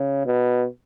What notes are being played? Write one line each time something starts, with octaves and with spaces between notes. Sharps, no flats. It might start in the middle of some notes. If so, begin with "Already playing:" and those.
Already playing: C#3
B2